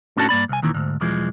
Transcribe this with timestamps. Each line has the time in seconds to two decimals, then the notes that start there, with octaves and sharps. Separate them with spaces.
0.17 A2 C#4 D4 F#4 A4 A5
0.29 G2 A#3 D5 B5
0.49 C2 G#5
0.62 D#2 A#2 D#3 E3
0.74 D2 G#2
1.01 B1 E2 E3 F3 G#3